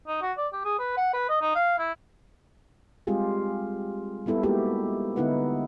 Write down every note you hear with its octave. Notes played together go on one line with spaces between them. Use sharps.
D#4
F#4
D5
G4
G#4
B4
F#5
B4
D#5
D#4
F5
E4
G3 G#3 C4 F4 G4 G#4
G3 B3 E4 A4 B4
G#3 A#3 D#4 E4 F#4 G4
D3 B3 D#4 E4 B4 F#5